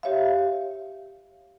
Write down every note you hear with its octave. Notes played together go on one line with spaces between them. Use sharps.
G4 C#5 E5 F5